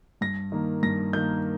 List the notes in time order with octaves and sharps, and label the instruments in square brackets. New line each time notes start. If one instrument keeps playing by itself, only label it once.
[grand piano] G2 A#6
D#3 A#3
G2 A#6
D#3 A#3 G6